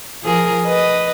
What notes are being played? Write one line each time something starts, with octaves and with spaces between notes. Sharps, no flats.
F3 G#4 A#4
B4 D#5